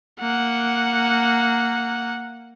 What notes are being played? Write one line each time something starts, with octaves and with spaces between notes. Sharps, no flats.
A#3 F#5